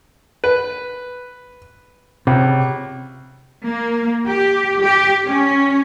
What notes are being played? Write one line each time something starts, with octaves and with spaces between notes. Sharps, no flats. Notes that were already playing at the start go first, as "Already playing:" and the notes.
B4
C#2 C3
A#3
G4
G4
C#4